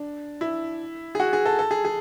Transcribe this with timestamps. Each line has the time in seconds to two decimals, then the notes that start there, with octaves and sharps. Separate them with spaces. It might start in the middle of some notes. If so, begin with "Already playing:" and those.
Already playing: D4
0.41 E4
1.15 G#4
1.20 F#4
1.33 G#4
1.46 A4
1.59 A4
1.71 G#4
1.85 G#4